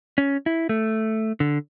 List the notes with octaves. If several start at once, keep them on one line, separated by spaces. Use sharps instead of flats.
C#4
E4
A3
D3